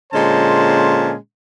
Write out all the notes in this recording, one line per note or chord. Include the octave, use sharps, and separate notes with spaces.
A#2 D3 G#3 C#4 C5 A5